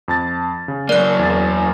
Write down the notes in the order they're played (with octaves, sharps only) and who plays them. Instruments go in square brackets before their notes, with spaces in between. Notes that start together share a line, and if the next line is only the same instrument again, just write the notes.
[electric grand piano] F2 A5 A6
C#3
[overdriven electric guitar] F#2 A#3 [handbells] D5 F#6
[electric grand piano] E2 A6